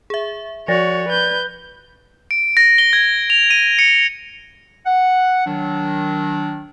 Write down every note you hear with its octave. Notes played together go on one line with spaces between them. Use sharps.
G#4 E5
F3 F#4 C#5 D5 A6 A#6
B4 G6
D7
A#6
G7
G#6
F7
D#7
C#7
F#5
D#3 F#3 D4